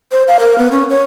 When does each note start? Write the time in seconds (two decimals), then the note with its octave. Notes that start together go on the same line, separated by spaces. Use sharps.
0.12 C5
0.28 F5
0.39 A#4
0.58 B3
0.72 C#4
0.90 C#5